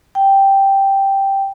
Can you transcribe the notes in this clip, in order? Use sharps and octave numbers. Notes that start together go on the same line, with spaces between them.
G5